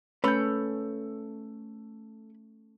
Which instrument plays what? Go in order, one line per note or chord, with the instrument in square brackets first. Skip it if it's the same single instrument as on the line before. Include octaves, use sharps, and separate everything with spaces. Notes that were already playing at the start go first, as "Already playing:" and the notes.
[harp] A3 [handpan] C#4 [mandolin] A4 G6 [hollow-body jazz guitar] B4 C#5 B5